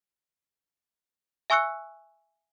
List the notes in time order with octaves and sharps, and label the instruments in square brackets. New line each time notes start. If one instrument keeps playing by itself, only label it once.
[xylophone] E5 G#5 C#6 E6 F#6 C#7